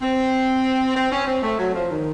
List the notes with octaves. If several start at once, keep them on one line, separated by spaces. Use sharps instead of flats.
C4
C4
C#4
C4
A3
F#3
F3
D#3